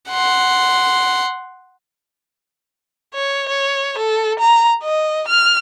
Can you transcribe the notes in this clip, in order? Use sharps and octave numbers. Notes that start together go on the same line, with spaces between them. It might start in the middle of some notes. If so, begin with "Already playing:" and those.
F#5 C6
C#5
C#5
A4
A#5
D#5
F6